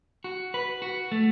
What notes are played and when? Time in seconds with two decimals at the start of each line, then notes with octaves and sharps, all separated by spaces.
0.24 F#4
0.54 B4
0.82 F#4
1.12 A3